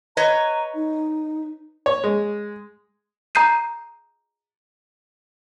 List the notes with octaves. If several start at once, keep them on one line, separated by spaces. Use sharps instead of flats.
B4 C#5 D#5 A#5
D#4
C#5
G#3
A#5 D#6 G6 C7 D#7